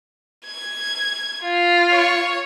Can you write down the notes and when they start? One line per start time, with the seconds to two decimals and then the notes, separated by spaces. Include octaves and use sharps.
0.47 G#6
1.43 F4
1.92 C#5